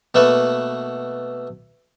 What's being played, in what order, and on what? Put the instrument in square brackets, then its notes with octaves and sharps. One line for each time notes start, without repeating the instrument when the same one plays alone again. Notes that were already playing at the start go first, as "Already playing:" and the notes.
[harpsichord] B2 A3 A#3 A4 B4